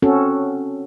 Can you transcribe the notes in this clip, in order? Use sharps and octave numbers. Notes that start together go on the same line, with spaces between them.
C4 C#4 F#4 A4